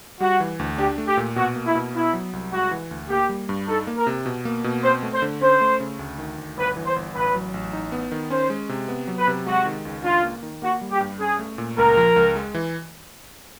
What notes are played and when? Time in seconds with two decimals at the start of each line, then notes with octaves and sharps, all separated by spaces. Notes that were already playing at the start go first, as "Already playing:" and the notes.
0.20 G3 F#4
0.40 E3
0.59 D2
0.78 D4 G4
0.98 A3
1.08 G4
1.17 A#2
1.36 B2 F#4
1.56 A#3
1.66 E4
1.75 B2
1.94 B3 E4
2.13 F#3
2.33 C2
2.52 G#3 F#4
2.71 E3
2.91 D2
3.09 A#3 G4
3.29 G3
3.49 G2
3.68 D#4 A4
3.87 A#3
3.97 A#4
4.07 C3
4.26 B2
4.45 A#3
4.64 B2
4.83 C4 C5
5.03 A3
5.13 C5
5.22 D3
5.41 C#4 C5
5.61 A3
5.80 C#3
5.99 D2
6.18 D#3
6.38 D2
6.57 G1 B4
6.76 E3
6.86 C5
6.96 G1
7.15 A1 B4
7.34 F#3
7.54 A1
7.73 D#4
7.92 B3
8.12 D#3
8.30 C#4 C5
8.50 G#3
8.69 C3
8.88 B3
9.07 F#3
9.18 B4
9.27 C3
9.46 G#3 F#4
9.66 D#3
9.85 C#2
10.04 D4 F4
10.23 A#3
10.43 D#3
10.62 A#3 F#4
10.81 G3
10.91 G4
11.01 G2
11.20 C#4 G#4
11.39 A3
11.58 A#2
11.77 C#2 A#4
11.97 F3
12.16 C#2
12.36 G#3
12.54 E3